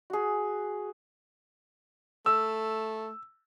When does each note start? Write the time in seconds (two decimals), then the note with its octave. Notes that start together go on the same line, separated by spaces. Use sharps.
0.10 F#4 G#4
2.26 A3 E6